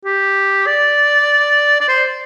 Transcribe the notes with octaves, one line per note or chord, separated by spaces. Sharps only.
G4
D5
D5
C5